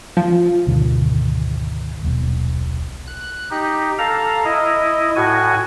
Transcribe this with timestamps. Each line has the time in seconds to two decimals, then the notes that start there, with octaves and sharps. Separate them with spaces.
0.17 F3
0.66 G#1 D2 B2 D#3
2.02 D#1 B1
3.08 F#6
3.51 D#4 G4
3.98 A4 F5 A#5
4.45 E4 D#5
5.16 A2 F#4 G#5